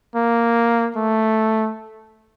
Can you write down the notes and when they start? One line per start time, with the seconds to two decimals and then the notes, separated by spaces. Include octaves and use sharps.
0.15 A#3
0.96 A3